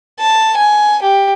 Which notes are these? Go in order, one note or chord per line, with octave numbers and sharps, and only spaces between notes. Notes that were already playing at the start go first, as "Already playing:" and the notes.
A5
G#5
G4